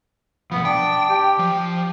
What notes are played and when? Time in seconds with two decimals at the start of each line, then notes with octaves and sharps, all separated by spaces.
0.52 B2 F3 B3
0.65 D4 G5
1.09 G4
1.39 F3